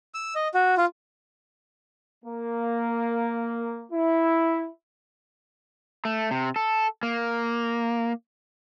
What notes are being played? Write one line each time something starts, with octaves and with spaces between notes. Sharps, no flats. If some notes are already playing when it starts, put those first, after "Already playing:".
E6
D#5
F#4
F4
A#3
E4
A3
C3
A4
A#3